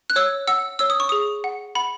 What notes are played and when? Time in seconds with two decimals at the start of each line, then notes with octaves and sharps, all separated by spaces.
0.10 F#6
0.16 C#5 E6
0.48 F#5 E6
0.79 C#5 E6
0.90 D#6
1.00 C#6
1.09 G#4 D#6
1.44 F#5
1.75 F#5 B5